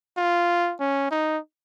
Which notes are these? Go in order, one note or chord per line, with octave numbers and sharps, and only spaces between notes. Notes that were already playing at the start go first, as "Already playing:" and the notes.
F4
C#4
D#4